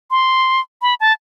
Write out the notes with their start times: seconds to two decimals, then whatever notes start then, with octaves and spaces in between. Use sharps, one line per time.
0.11 C6
0.82 B5
1.00 A5